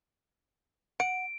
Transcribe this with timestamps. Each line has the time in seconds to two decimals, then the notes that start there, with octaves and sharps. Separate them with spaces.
1.00 F#5 D7